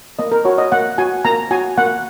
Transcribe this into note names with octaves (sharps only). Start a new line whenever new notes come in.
A#3 D#5
A#4
F#4 C#5
D#5
A#3 F#5
F#4 G#5
A#3 A#5
F#4 G#5
A#3 F#5